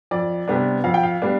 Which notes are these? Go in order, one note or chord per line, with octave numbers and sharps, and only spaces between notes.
F2 D5
C3 G3 B3 D4
F2 F5
G5
F5
G3 B3 D4